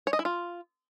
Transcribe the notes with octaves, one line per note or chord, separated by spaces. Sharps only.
C#5
D#5
E4
F4